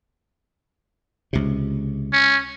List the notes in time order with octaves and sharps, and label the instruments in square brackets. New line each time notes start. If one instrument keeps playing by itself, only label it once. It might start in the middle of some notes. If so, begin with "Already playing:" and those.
[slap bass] C#2 C3
[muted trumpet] C#4